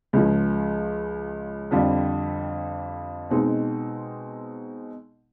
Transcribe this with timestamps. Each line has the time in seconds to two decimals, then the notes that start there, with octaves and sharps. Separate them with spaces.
0.13 C#2 C#3 F3
1.71 F2 D3 G3 C4 F4
3.30 B2 G#3 C4 D#4